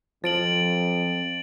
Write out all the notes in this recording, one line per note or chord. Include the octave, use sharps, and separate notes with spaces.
F2 F3 A6 D7 F#7